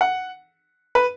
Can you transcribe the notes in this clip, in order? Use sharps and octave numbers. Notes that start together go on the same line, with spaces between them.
F#5
B4